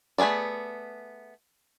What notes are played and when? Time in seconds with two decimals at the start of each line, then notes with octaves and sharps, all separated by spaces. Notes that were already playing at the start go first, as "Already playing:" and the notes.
0.18 A3 B3 G#4 A4 D5